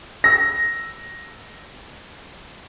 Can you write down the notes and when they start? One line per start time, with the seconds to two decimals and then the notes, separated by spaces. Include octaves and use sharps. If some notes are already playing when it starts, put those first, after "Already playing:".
0.24 E6 A#6